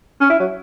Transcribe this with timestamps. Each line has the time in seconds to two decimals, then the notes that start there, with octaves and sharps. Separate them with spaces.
0.21 C#4
0.30 E4
0.40 F#3